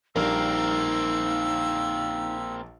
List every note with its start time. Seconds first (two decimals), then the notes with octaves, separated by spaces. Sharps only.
0.16 A#1 G3 A#3 C4 D#4 A#4 E6